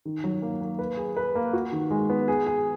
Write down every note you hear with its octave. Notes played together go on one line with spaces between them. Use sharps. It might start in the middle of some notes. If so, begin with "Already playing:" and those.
D#3
F#3
A#3
A#3
B4
G#4
B4
A#3
F#4
D#3
G#3
B3
G#4
G#4